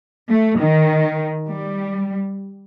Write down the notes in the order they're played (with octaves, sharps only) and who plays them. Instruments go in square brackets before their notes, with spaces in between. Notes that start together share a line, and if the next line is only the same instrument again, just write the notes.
[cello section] A3
D#3
G3